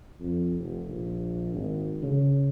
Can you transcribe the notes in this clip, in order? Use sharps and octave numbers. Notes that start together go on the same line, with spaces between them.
F2
F1
A#1
G#1
C#3